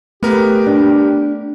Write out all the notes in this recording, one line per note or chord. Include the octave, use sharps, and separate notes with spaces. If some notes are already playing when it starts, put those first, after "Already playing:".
A3 B3 G4 A#4 B4
D4